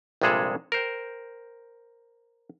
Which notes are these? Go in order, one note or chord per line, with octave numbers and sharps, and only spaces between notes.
A#1 G2 C3 G#3 G#4 A4
A#4 C5 G5